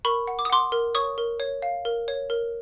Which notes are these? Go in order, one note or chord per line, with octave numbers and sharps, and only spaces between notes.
A#4 B5 C#6
F#5
D6
D#6
F#5 C6 D6
A#4
C#5 C#6 D#6
A#4
C#5
F5
A#4
C#5
A#4